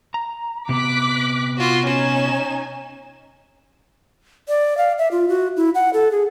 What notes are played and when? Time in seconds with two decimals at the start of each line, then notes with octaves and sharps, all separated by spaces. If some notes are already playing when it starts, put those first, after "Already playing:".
0.14 A#5
0.69 C3 B3 D6 F#6 B6
1.58 F4 F#4
1.86 C#4 D#4 G#5 E7
4.48 D5
4.78 F5
4.98 E5
5.11 F4
5.29 F#4
5.57 E4
5.75 F#5
5.94 A4
6.12 G#4